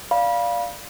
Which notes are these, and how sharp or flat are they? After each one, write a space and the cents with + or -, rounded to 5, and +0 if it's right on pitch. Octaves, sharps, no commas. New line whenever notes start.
D5 +0 F5 +0 B5 -25